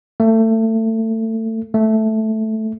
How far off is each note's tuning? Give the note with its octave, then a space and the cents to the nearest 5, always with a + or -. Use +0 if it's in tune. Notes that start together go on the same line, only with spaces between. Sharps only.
A3 +25
A3 -5